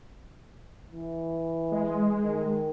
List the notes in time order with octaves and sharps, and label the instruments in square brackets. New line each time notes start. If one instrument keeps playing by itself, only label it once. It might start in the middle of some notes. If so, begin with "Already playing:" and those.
[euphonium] E3
[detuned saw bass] G#3
[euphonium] D#3